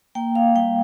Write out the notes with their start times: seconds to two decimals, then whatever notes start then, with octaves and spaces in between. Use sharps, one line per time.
0.15 A#3 G5
0.35 F5
0.55 G3 G5